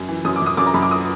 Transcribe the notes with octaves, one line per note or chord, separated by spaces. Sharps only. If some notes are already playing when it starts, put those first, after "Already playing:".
Already playing: F#2
E3
F#2 D#6
D6
F#2 D#6
F#2 D6
A#5
F#2 B5
D6
D#6